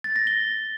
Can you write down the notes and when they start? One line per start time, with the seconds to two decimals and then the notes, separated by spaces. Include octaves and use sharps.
0.04 A6
0.16 A#6
0.27 G7